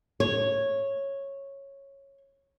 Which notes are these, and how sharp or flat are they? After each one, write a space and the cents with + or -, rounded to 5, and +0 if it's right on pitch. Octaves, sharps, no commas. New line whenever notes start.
C#5 -10